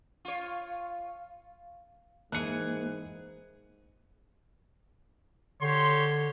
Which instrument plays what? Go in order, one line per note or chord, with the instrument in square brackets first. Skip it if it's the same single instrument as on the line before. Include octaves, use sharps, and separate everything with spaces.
[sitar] F4 C#5
[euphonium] G#2 [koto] E3 G#4 [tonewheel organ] A#3 [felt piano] F#6 C#7
[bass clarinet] D3 [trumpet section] G4 C#5 C6